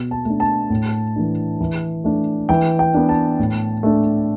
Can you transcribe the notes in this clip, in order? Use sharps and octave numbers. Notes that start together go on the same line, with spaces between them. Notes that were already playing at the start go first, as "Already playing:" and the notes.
Already playing: B2
A5
A3 D4
A5
A2
E3 A3 D4
E3
A3 D4
E3 G5
G5
B3 D4
A5
A2
A3 D4